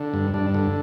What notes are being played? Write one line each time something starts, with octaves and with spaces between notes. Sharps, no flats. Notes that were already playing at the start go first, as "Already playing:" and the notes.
Already playing: D3
G2
G2 D4
D3